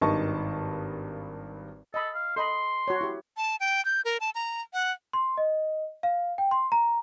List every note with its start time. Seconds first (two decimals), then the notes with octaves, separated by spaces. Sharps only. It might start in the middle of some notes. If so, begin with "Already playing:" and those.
0.01 G#1 G2 D#3 D#5 A5 C#6
1.94 A4 D#5 B5
2.14 F5
2.36 A4 D#5 B5 C6
2.88 F#4 C#5
3.01 E4 G4
3.37 A5
3.60 G5
3.85 G6
4.05 A#4
4.20 A5
4.35 A#5
4.73 F#5
5.13 C6
5.37 D#5
6.03 F5
6.38 G5
6.51 C6
6.72 A#5